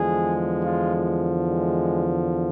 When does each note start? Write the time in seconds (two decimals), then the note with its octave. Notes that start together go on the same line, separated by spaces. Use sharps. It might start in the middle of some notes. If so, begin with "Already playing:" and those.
Already playing: E2 D3 F3 G#3 G#4
0.63 F4
1.49 G#3